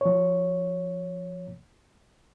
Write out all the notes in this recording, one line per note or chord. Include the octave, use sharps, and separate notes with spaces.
F3 C#5